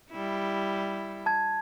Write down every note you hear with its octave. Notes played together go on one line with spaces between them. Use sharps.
G3 E4
A5 G#6